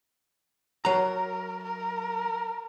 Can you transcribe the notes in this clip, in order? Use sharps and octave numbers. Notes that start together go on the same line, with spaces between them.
F#3 A#4 A#5
A#4